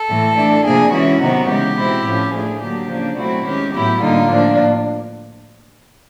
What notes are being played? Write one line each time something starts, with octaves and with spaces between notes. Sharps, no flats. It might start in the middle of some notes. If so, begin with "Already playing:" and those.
Already playing: A4
A2 E3 A3
E3 A3 D4
C3 F3 A#3 D4 G#4
E3 G#3 C#4 E4 F#4
C3 D#3 F#3 B3 D#4
C#3 E3 G#3 G4
B2 G#3 C4 E4
A2 F3 A3 C#4
F3 A3 D4 G#4
D3 F#3 A#3 D4 G4
C#3 F3 A#3 D4
B2 F#3 A3 C4 E4 F#4
D#3 G#3 C#4 G4
A2 F#3 B3 E4 G4
D3 G3 A#3 D#4 F4
A2 F3 A#3 D4